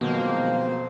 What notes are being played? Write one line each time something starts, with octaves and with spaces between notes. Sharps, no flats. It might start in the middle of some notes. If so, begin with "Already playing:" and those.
F2 B2 D#3 F3 F#3 G#3 A#3 C5